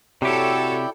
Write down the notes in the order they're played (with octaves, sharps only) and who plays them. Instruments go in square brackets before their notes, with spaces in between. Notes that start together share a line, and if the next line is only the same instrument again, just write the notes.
[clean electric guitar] C3 G4 [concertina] E4 D5 G5 [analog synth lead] F#4 [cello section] A4 C#5